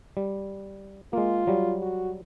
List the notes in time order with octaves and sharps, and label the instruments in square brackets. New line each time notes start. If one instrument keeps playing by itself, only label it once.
[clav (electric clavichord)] G3
[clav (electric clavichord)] G#3 A#3 [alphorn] F4
[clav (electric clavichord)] F#3 G3
[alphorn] F#4